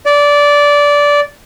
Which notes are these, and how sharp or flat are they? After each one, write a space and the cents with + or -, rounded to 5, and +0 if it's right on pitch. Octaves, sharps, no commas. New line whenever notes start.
D5 -15